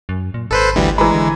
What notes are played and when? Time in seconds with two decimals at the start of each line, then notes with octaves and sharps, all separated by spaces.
0.09 F#2
0.34 A#2
0.51 G#1 A4 B4 C5
0.76 D2 E3 G3
0.98 E3 G#3 A#5 B5
1.14 D3